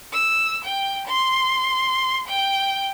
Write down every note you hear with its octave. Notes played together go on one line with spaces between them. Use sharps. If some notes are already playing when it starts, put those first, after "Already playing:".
E6
G5
C6
G5